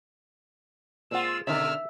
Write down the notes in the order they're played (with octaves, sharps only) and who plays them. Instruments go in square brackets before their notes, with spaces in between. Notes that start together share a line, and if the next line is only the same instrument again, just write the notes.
[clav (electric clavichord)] A#2 C4 F#5 [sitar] G#3 F4 [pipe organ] E6
[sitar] B2 D3 [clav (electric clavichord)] D#3 C#4 [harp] E5 [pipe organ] E6 F6